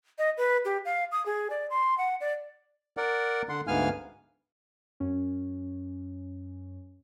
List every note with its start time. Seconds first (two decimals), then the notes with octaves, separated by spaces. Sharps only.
0.18 D#5
0.37 B4
0.65 G4
0.85 F5
1.12 D#6
1.26 G#4
1.50 D5
1.70 C6
1.98 F#5
2.21 D5
2.97 A#4 D5 F#5
3.49 D3 F#5 C6
3.67 D2 G#2 B3 F5 G#5 F6
5.00 F#2 C#4